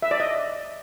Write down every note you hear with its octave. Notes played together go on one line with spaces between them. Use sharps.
E5
D5
D#5